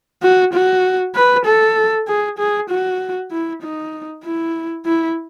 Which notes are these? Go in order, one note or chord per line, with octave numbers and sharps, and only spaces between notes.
F#4
F#4
B4
A4
G#4
G#4
F#4
E4
D#4
E4
E4